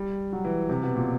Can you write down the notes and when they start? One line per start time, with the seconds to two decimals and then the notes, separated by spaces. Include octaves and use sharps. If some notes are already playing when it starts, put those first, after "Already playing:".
Already playing: G3
0.32 F#3
0.45 E3
0.69 C3
0.83 B2
0.96 A#2